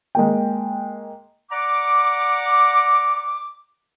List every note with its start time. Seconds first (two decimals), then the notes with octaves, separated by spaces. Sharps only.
0.15 G#3 A#3 G5
1.51 D5 F#5 A#5 D6